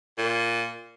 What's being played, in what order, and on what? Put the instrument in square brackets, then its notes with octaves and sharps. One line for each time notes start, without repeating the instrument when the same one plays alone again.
[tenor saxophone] A#2